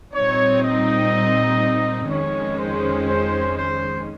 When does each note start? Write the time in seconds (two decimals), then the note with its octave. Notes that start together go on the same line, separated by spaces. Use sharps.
0.13 A#2 G3 C4 D#4 C#5
0.63 D#5
2.09 F2 D#3 G#3 C#4 C#5
2.59 C5
3.08 C5
3.57 C5